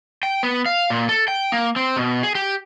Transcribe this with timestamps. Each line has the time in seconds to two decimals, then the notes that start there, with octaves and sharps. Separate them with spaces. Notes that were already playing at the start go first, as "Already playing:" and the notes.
0.23 G5
0.43 B3
0.66 F5
0.90 A#2
1.09 A4
1.28 G5
1.52 A#3
1.76 C4
1.96 B2
2.23 G#4
2.35 G4